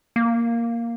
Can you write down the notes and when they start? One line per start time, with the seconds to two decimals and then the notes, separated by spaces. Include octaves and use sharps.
0.16 A#3